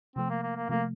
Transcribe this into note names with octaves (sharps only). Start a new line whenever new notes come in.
C3 F3 A3 C4
A#3
A#3
A#3
C3 F3 A3 A#3